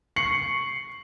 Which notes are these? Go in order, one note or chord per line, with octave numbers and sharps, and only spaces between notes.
C#6 C7 C#7 F#7